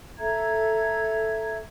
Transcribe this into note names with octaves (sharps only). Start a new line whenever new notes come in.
A4 E5 A#5 G#6